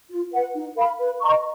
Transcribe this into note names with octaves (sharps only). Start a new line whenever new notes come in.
F4
B4 F#5
D#4
A#4 F5 B5
B4
D#5 A#5 C#6